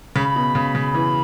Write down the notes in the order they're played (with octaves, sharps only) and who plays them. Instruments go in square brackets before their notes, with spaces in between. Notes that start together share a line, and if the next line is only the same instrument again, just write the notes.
[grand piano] C#3 [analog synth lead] B5
[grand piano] B2
C#3
C#3
E3